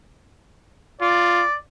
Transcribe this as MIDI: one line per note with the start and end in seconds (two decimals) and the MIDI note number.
1.01 1.45 65
1.01 1.55 74